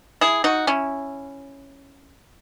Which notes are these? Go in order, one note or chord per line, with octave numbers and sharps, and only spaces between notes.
E4 G#4
D#4 F#4
C#4 E4